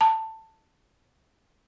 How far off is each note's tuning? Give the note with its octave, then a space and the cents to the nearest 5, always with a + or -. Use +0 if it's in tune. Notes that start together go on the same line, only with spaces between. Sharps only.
A5 +15